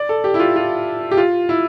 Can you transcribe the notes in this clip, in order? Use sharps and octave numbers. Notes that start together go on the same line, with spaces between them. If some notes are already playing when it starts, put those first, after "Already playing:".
Already playing: D5
A4
G4
E4
F4
F4
G4
F4
E4